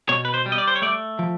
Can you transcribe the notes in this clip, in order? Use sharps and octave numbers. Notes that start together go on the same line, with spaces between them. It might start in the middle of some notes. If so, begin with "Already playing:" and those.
B2 C#5
B4
C5
G3
D#5
D5
C5
C#5
A3 D5
F3